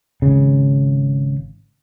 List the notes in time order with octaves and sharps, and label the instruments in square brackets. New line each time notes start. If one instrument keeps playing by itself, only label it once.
[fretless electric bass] G#1 C#3